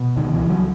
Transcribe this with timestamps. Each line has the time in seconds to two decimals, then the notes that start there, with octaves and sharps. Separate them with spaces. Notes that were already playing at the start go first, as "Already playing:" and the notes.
Already playing: B2
0.16 C#2 D#3
0.34 E3
0.42 C#2
0.50 F#3